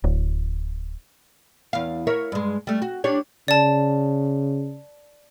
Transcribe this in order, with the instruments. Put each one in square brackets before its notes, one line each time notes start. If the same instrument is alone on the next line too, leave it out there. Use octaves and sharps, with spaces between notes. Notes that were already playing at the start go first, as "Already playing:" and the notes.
[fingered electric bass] D1
[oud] E2 F5
A#4 C#5 E5
G2 G#3
G3 A3
F#4
D4 G4 C#5
[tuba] C#3 [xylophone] D5 A5